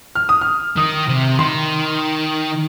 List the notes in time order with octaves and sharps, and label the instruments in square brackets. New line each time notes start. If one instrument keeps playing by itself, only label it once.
[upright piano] F6
D#6
F6
[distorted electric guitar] D#3 [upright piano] D#6
[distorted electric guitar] C3
[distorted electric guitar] D#3 [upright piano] C6